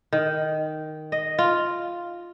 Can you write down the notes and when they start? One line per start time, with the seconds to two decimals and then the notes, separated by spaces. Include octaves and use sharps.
0.12 D#3
1.12 D#5
1.39 F4